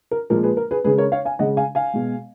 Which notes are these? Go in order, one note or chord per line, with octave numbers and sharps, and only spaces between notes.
A#4
A#2 F3 G#3 A#4
G#4 B4
A#4
G#4 B4
C#3 G#3 G#4 B4
A#4 C#5
C#5 F5
F5 G#5
C#3 G#3 D#5 F#5
F5 G#5
F5 G#5
B2 G#3